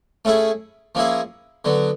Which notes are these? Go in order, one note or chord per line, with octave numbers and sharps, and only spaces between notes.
A3 C#4 E4 G#4
F3 A#3 C#4 E4 G#4
D3 F#3 B3